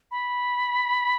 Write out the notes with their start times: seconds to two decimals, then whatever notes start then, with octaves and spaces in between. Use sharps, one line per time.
0.11 B5